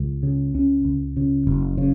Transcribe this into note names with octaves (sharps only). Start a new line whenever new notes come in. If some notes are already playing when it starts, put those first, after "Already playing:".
Already playing: C#2
C#3
C#2 C#4
C#2
C#3
F#1
C#3